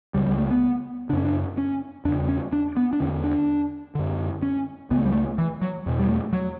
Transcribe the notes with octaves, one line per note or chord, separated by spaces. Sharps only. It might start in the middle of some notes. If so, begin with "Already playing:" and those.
C#2 C#3 G3
G3
A3
B3
F#2 C#3 C#4 D4
D4
C#4
E2 C#3 D4
C#4
D4
B3
D4
E2 D3 C#4
D4
F#2 D3
C#4
C#2 C#3 B3
A3
G3
A3
E3
F#3
E2 B2
G3
A3
F#3